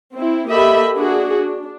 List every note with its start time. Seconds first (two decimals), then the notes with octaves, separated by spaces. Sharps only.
0.15 C4 E4
0.49 A#3 G4 A4 D#5 E5 B5
0.95 D4 F#4 G#4
1.39 D4